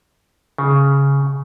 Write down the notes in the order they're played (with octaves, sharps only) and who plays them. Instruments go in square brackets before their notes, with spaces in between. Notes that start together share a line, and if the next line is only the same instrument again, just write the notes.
[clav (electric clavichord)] C#3